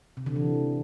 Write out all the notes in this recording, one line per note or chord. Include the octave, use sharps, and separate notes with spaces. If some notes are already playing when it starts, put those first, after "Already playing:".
C3
D3
E3